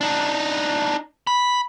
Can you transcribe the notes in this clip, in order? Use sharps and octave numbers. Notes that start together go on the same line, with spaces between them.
D4 D#4
B5